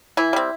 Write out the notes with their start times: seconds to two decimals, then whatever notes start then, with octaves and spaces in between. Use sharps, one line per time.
0.17 E3 E4
0.33 G3 C4